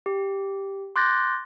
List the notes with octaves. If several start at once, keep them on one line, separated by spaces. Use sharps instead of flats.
G4
C6 D6 F#6 G6 A6 A#6